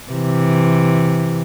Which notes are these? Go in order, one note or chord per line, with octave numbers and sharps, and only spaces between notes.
C3 E3